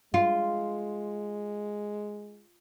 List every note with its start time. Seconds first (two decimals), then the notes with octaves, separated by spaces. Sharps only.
0.14 G#3 F4